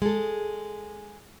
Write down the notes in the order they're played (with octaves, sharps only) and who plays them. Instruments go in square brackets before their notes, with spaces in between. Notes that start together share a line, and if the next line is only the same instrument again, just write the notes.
[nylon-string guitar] G#3 G#4 A4